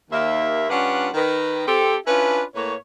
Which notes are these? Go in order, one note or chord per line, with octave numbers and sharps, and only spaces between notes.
D#2 A#3 E5
G2 C#4 D4 F4 B4 F#5
D#3 B4
C4 G4 A4
C#4 D4 E4 F4 B4
A2 A#3 B4 C#5